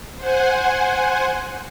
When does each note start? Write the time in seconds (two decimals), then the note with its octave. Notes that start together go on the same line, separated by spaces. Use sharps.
0.16 C5 F#5 G#5